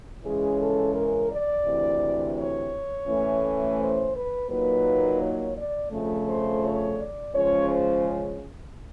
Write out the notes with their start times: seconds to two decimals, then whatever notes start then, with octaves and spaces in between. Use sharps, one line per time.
0.23 C#3 E3 G#3 C#4 G#4
0.59 A4
0.95 A#4
1.31 D5
1.66 D2 C3 E3
2.37 C#5
3.08 A2 E3 A3 C#4
3.78 C5
4.14 B4
4.49 A#2 F#3 A#3 D#4 B4
5.21 C#5
5.56 D5
5.92 F2 C#3 F3 A3
6.28 C5
6.63 C#5
6.99 D5
7.33 C#3 F3 G#3 C#4 C#5
7.69 C5